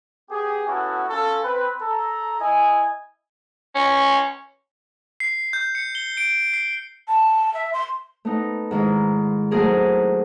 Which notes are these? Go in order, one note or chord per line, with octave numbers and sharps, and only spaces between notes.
B3 G4 G#4
B3 C#4 E4 F#4 A4
C#4 F4 A4
C4 B4
A4 A#5
E4 D#5 G#5
C#4
C7
G6
C#7
G7
D7
C7
A5
E5
C6
A3 B3 D#4
G#2 D#3 E4
F#3 A3 C4 G#4 A#4